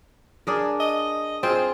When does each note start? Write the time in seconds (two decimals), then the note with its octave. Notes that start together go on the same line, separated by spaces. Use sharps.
0.47 D4 G#4 A#4
0.80 D#5
1.43 C4 F4 G#4